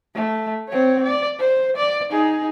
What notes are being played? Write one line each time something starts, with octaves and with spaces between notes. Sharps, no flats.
A3
C4 C#5
D5
C5
D5
D#4 G#4